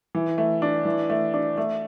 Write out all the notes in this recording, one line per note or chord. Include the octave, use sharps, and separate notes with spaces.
E3
A3
D4
E3
A3
D4
A3